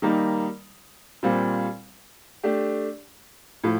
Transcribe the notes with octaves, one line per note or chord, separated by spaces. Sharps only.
D#3 G3 A#3 D#4
A#2 G3 C4 F4
A3 D4 G4
A2 F3